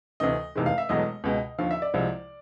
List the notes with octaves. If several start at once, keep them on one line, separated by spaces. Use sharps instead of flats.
D2 C3 E3 A3 D#5
F1 E2 C3 D#3 G#3
F5
E5
E1 E2 B2 F#3 A3 D#5
C#2 B2 G#3
D#2 D3 F3 F5
E5
D5
C2 C3 F3 G#3